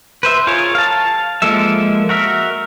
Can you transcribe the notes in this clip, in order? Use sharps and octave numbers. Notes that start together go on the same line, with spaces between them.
B4 C5 E5
F4 G#4 A#4 C#5
F5 A5
F3 G#3 A#3 A4 E5
F#4 A#4 E5